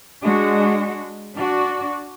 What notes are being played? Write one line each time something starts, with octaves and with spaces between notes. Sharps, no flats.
G#3 D4 F#4
D4 F#4 D5